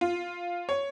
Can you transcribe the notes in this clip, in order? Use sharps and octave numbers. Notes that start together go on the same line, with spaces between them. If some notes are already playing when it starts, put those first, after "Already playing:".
F4
C#5